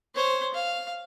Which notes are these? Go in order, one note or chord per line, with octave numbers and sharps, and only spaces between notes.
C5 C#5
F5